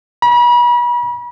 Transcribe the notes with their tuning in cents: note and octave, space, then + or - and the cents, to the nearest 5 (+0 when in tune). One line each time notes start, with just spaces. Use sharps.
B5 -40